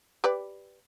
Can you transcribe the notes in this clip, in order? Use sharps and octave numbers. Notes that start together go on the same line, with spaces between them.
G4 B4 D5